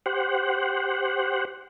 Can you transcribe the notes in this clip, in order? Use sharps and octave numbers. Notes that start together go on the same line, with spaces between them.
G4 C5 F#5